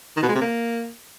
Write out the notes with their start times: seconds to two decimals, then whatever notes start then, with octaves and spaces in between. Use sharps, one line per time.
0.17 D#3
0.23 B2
0.29 G#3
0.35 C3
0.41 A#3